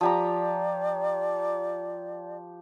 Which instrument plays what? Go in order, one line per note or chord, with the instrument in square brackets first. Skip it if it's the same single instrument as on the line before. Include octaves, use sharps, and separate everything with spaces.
[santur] F3 G4 A#5 [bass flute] D5